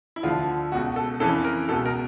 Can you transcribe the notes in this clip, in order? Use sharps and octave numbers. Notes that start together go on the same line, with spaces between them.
E4
D2 D3 F3 F4
C#2 B2 F#4
A4
F2 C#3 E3 A4
A#4
C#2 B2 A4
A#4